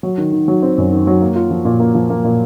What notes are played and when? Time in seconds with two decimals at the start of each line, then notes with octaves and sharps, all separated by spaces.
0.03 F#3
0.18 D#3
0.32 D#3
0.48 F#3
0.62 C4
0.78 F#2
0.92 D#3
1.07 F#3
1.22 A#3
1.35 F4
1.51 F3
1.65 A#2
1.80 A#3
1.95 F3
2.10 A#3
2.24 A#2